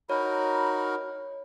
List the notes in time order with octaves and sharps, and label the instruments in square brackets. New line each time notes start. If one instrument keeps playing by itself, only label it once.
[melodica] D#4 F#4 A#4 [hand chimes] C#5 [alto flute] B5